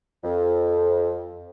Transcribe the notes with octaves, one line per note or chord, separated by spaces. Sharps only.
F2